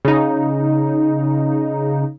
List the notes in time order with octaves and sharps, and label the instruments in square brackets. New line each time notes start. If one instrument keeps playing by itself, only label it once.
[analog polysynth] C#3 D#4